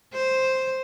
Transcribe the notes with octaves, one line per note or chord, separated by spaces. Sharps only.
C5